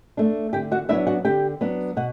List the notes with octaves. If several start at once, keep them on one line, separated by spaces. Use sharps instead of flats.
A3 D4
D3 G4 G5
F#4 F#5
F#3 B3 D4 E4 E5
F#4 F#5
D3 G4 G5
F#3 B3 D4
B2 F#5